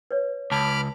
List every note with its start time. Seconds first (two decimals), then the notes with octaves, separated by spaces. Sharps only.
0.11 B4 C#5
0.51 C#2 A5 B5 D6 F6